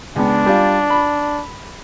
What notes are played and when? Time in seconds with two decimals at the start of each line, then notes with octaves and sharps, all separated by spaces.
0.16 C#2 B3 D4
0.46 G3 F4
0.90 B5